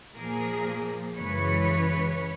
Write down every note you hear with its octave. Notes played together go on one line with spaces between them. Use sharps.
A#2 F3 A#3 G#4 A#4
F#2 C#3 E3 G#3 B4 C#5